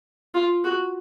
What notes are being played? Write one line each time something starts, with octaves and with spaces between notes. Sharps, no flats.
F4
F#4